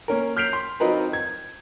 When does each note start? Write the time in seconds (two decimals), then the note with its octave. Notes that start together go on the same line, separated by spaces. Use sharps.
0.08 A#3 C#4 A#4
0.36 F6 G6 B6 C7 D7 F7
0.53 C6
0.80 F#3 C4 D#4 F4 A#4 B4
1.13 G#6